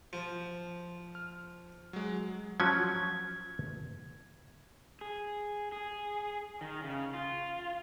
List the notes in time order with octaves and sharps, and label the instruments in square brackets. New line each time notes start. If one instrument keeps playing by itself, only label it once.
[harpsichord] F3
[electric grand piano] F6
F#3 G#3
[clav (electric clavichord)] F3 F#3 C#4 [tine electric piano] G#6
[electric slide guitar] G#4
G#4
D#3
C#3
F4